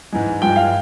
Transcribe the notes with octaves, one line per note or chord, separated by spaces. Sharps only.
G#2 E3 G#3
G2 F3 G#3 G5
F5